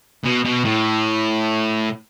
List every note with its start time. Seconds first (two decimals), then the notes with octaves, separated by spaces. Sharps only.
0.25 B2
0.45 B2
0.64 A2